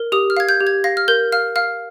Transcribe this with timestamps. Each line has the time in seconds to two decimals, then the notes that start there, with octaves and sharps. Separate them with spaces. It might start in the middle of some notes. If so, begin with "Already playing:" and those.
Already playing: A#4
0.12 G4 D#6
0.30 F6
0.37 F5 G#6
0.49 G6
0.60 G4
0.67 G#6
0.84 F5 A#6
0.97 F6
1.08 A#4 G6
1.32 F5 F6
1.56 F5 F6